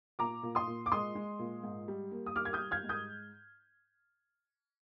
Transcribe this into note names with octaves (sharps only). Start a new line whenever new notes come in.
A#2 A#5 D6
A#2
C6 D#6
A#2
D6
G#3 C6 D#6
G#3
A#2
G#2
G3
A#3
D#6
G3 D6 F6
G#6
D#6 G6
G3
F6 G#6
G#2
D#6 G6